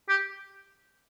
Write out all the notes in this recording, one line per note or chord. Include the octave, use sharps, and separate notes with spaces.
G4